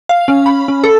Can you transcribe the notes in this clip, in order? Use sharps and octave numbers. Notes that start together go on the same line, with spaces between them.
F5
C#4
B5
C#4
A4